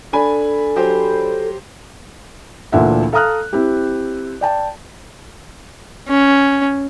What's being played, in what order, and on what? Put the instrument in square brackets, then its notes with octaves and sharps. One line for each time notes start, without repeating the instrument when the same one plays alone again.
[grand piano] D4 G#5 B5 [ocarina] A4
[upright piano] F#3 G4 C5
[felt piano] D2 A#2 E3 D4 E5 F#5
A4 F5 A#5 D#6 F6 F#6
C4 E4 G4
D5 G5 A5
[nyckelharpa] C#4